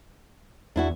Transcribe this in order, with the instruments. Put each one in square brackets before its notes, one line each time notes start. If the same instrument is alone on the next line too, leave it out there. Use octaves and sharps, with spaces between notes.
[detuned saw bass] E2 [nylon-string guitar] D4 E4 F#4